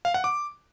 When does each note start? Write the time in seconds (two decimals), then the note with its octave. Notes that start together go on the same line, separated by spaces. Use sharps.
0.05 F5
0.14 F#5
0.24 D6